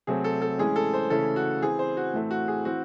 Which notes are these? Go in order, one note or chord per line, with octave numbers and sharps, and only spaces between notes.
C3 F#3 A3 C4 G#4
A4
A4
A2 E3 G#3 C#4 G#4
A4
C5
C#3 E3 A3 C#4 A4
F#4
E3 C4 G#4
C5
F#4
A2 E3 A3 C4
F#4
G#4
E3 C4 F#4